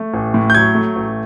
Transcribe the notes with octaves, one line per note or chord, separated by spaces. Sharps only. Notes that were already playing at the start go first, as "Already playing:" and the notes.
Already playing: A3
A1
A2
G6
F#3 G#6
A3
A1